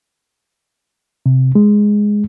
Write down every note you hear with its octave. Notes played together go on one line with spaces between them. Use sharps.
C3
G#3